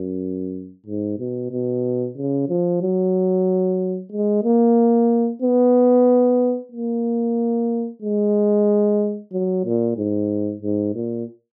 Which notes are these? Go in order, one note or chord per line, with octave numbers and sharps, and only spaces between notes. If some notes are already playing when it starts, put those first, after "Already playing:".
Already playing: F#2
G#2
B2
B2
C#3
F3
F#3
G#3
A#3
B3
A#3
G#3
F#3
A#2
G#2
G#2
A#2